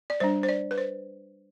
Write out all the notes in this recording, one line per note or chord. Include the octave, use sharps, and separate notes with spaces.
D5
G3 D4 C5
C5
D5
B4
C5